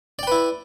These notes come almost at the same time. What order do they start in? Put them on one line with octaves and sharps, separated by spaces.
D5 G5 B4 E4